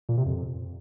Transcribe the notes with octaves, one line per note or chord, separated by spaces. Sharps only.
A#2
C3
F2